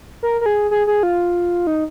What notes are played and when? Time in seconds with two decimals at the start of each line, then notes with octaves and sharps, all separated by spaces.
0.23 A#4
0.41 A#4
0.46 G#4
0.71 G#4
0.87 G#4
1.03 F4
1.67 D#4